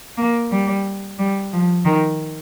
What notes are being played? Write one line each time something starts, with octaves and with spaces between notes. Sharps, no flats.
A#3
G3
G3
F3
D#3